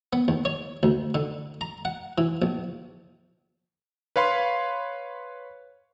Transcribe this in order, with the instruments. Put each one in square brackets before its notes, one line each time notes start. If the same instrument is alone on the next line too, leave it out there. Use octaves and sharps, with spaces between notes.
[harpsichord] B3
D#2
C#5
D2
D3
A#5
F#5
E3
A#1
[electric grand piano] B4 C#5 F5 B5 C6